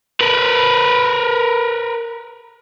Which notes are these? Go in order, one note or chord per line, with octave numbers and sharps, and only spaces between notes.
A#4 B4